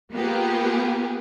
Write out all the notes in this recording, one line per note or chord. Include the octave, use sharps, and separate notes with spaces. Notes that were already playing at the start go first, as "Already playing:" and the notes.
A#3 B3 F4 G4 G#4